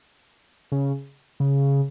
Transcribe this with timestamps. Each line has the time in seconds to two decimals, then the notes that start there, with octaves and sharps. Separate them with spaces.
0.72 C#3
1.40 C#3